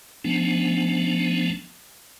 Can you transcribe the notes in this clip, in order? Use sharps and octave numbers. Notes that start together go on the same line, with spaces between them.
F3 A3 B3 C#4 D4